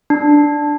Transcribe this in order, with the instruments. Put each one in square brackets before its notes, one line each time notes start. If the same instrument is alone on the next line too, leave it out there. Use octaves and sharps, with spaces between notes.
[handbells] D4